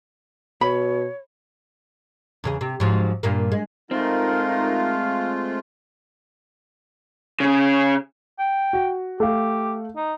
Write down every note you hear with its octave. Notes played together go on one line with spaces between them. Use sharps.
B2 C#5 B5
E2 C#3 G#4
C3
G#2 F3 F#3
G2 A#2 A#3
G#3
G#3 A3 C4 D#4 F4 A#4 F5
C#3 C#4
G5
F#4
A3 G4 F5
D#4